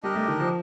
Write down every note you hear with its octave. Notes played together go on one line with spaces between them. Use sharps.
G3 D4 G4 A#4 D#5
A3
D#3
F3